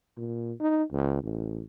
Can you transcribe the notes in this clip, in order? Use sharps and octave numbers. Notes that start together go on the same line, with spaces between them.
A#2
D#4
C#2
A1